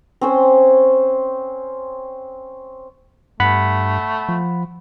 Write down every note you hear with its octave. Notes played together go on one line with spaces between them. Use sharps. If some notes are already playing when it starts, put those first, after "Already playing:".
C4 C#4 C5
G2 A3 F#5 B5
F3